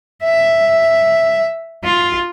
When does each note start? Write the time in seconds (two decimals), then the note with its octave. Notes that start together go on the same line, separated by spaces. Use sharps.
0.24 E5
1.84 F4